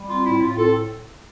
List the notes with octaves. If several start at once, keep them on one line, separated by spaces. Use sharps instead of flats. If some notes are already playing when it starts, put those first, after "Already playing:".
Already playing: G3
C4 F4
A2 E4
A2 F4
C4 A4